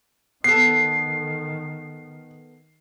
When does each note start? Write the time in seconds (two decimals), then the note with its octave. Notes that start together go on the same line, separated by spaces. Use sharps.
0.44 D#3 B3 A4 C7